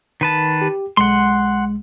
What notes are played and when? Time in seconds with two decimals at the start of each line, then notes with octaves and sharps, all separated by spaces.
0.21 D#3 B4 A5
0.62 G4
0.97 B1 G#3 F#5 C6